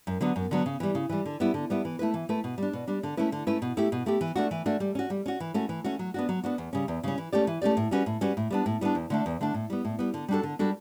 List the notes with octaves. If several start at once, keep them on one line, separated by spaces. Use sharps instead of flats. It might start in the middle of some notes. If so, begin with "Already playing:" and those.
F#2
D3 F#3 B3
F#2
D3 F#3 B3
C#3
E3 G3
C#3
E3 G3
D3
G3 B3 E4
D3
G3 B3 E4
E3
A3 E4 B4
E3
A3 E4 B4
B2
G3 D4
B2
G3 D4
D3
A3 C#4 E4 B4
D3
A3 C#4 E4 B4
B2
A3 E4 G4
B2
A3 E4 G4
E3
A3 D4 F#4
E3
A3 D4 F#4
G3
C#4 F#4
G3
C#4 F#4
E3
A3 C#4 F#4
E3
A3 C#4 F#4
F#3
B3 D4 F#4
F#3
B3 D4 F#4
E2
C#3 G3 C#4
E2
C#3 G3 C#4
E3
A3 C#4 G4 D5
E3
A3 C#4 G4 D5
A2
G3 C#4 F#4 B4
A2
G3 C#4 F#4 B4
A2
G3 B3 D4
A2
G3 B3 D4
E2
D3 A3 D4
E2
D3 A3 D4
A2
G3 B3
A2
G3 B3
D3
G3 D4 F#4 A4
D3
G3 D4 F#4 A4